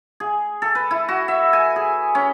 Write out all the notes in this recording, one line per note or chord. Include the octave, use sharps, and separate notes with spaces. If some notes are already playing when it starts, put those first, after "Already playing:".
G#4
A4
B4
E4
F#4
E5
G#5
G#4
C#4